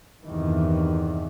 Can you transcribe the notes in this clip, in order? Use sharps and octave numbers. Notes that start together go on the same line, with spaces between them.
E2 G2 C3 D#3 E3